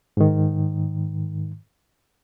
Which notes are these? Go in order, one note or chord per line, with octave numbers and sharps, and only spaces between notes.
G#2 D#3